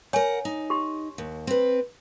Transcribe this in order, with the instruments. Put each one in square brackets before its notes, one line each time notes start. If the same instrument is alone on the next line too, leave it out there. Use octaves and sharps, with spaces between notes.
[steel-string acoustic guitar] A#4 F#5 [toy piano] C#5 G#5
[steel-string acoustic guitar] D#4
[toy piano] G4 C6
[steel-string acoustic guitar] D#2
C4 B4